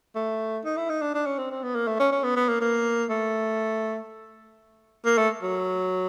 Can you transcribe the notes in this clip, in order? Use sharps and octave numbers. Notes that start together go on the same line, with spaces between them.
A3
D#4
E4
D#4
D4
D4
C#4
C4
C4
B3
A#3
A3
C#4
C#4
B3
B3
A#3
A#3
A3
A#3
A3
F#3